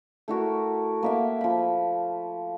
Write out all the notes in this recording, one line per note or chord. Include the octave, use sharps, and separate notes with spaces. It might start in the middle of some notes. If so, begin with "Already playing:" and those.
A3 E4 F#4 A#4
A#3 E5 F5
F3 B5